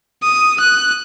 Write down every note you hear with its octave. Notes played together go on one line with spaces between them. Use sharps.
D#6
F#6